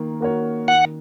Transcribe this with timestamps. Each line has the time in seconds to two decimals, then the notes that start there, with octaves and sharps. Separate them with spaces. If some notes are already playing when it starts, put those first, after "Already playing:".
Already playing: D#3 A#3
0.21 A#3 F#4 A#4 C#5
0.68 D#3 F#5